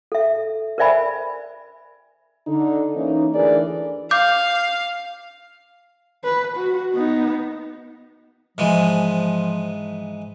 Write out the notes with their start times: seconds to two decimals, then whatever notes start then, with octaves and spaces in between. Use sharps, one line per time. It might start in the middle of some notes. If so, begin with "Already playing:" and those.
0.12 A4 E5
0.78 A#4 C5 D5 E5 G#5 B5
2.48 D3 D#4
2.95 E3 A#3 C#4 D#4
3.35 D2 E3 D4 G#4 A#4 D5
4.11 F5 D6 G6
6.25 B4
6.57 F#4
6.93 B3 D#4
8.58 G#2 E3 F3 G#3